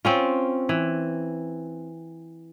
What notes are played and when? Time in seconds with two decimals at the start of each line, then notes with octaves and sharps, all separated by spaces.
0.05 C4 C#4 F4
0.69 E3